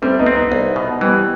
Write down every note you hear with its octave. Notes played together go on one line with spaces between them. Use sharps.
G3 A3 C4
B3 D#4
C4
B3 D#4
C2
B2
E3 G3 B3